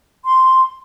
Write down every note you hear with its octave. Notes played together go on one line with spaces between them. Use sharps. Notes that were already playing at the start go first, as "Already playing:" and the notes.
C6